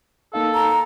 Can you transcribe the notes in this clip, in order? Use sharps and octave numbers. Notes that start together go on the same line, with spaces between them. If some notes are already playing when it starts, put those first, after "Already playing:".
A#3 D#4 A4 F5
A#5